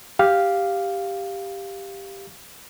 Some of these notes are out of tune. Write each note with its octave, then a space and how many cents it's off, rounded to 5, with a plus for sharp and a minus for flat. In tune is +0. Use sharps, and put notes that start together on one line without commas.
G4 +5 F5 +0